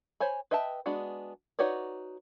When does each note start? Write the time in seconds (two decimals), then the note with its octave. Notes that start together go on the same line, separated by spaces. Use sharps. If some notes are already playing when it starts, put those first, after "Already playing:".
0.20 C5 C#5 G#5 B5
0.51 B4 D#5 E5 G5 A5
0.86 G#3 B3 D4 F#4
1.59 D#4 F#4 B4 C#5 D5